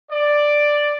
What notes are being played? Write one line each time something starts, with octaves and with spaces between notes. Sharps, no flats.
D5